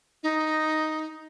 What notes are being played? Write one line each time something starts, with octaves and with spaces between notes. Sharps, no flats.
D#4